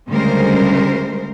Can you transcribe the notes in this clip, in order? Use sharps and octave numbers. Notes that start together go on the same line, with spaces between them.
D2 C#3 G3 G#3 A#4 C5